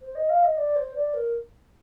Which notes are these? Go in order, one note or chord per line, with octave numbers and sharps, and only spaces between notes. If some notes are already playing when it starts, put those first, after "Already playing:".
C5
D#5
F5
D#5
D5
C5
D5
A#4